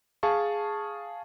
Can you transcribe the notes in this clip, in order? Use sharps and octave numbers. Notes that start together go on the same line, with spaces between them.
G#4 F5 A5 C#6